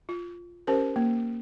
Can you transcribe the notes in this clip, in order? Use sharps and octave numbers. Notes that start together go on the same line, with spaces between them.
F4
C#4 G4 A#4 C5
A#3